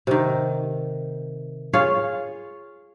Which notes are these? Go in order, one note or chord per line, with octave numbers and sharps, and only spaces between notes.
C3 D#3
F4 G#4 C#5 F5